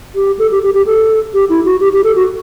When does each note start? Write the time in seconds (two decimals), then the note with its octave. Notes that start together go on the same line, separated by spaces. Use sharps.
0.15 G4
0.39 A4
0.51 G4
0.63 G4
0.74 G4
0.86 A4
1.34 G4
1.49 E4
1.65 F#4
1.80 G4
1.93 G4
2.04 A4
2.16 F#4